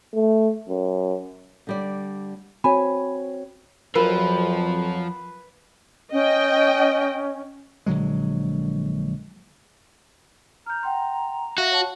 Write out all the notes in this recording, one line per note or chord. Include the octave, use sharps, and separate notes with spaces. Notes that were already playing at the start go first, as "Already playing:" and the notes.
A3
F#2
D3 G3 D5
C4 F#4 C#5 G#5 B5
F2 F3 F#3 A#4 B4
C#4 D#5 G5
A#1 D3 F#3 G#3
A#5 F6 G6
F#5 G5 C6
F#4 E5 F5 A#6
C#5 A5